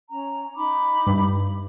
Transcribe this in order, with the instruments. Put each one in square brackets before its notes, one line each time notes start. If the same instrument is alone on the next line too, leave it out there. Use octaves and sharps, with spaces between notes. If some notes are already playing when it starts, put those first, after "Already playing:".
[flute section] C#4 A#5
D#4 B5 D6
[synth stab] G2